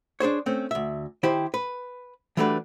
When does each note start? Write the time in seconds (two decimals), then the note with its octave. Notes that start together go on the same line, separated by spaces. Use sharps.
0.20 D4 G#4 C5 C#5
0.46 A3 C4 C#4
0.71 D2 E5
1.23 D#3 E4 G4 C5
1.54 B4
2.37 E3 G3 A3 D4 F#4 B4